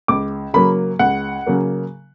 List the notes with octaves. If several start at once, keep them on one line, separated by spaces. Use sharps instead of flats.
C#2 D6
C#3 F#3 A#3 B5
C#2 F#5
C#3 F#3 A#3